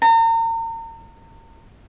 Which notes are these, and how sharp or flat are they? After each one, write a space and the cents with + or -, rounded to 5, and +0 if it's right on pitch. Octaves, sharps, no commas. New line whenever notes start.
A#5 -35